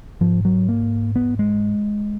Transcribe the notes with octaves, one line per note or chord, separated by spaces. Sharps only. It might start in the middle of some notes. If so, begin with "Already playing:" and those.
G#2 F3
F#3
A#3
B3
G#3